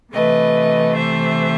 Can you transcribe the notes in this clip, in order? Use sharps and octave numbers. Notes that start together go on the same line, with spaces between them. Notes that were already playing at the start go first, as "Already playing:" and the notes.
C3 E3 A3 B4 D#5
C5 E5